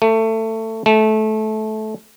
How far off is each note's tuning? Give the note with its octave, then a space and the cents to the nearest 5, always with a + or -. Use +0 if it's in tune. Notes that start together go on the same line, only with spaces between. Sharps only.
A3 +20
A3 -20